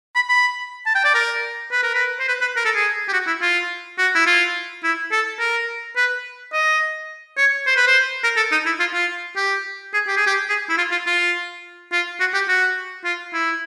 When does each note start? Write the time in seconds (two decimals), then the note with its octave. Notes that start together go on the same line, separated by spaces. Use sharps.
0.15 B5
0.29 B5
0.86 A5
0.95 G5
1.04 D5
1.14 A#4
1.71 B4
1.83 A#4
1.94 B4
2.20 C5
2.28 B4
2.41 B4
2.56 A#4
2.65 A4
2.75 G#4
3.08 G4
3.13 F#4
3.27 E4
3.41 F4
3.98 F#4
4.15 E4
4.26 F4
4.83 E4
5.12 A4
5.39 A#4
5.96 B4
6.53 D#5
7.37 C#5
7.67 C5
7.76 B4
7.87 C5
8.23 A#4
8.36 A4
8.52 D#4
8.65 E4
8.80 F4
8.93 F4
9.36 G4
9.93 G#4
10.08 G4
10.16 G#4
10.26 G4
10.49 G#4
10.69 E4
10.77 F4
10.92 F4
11.06 F4
11.92 F4
12.20 F#4
12.34 G4
12.48 F#4
13.04 F4
13.33 E4